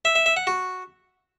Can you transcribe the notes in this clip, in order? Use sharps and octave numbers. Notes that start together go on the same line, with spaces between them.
E5
E5
E5
F#5
F#4